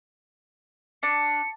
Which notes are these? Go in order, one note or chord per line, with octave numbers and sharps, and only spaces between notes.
D4 C#7